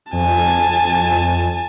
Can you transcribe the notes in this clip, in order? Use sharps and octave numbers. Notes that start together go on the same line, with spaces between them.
F2 G#5 A5